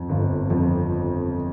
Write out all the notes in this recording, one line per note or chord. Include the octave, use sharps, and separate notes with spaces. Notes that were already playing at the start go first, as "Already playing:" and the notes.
Already playing: F2
G1
F2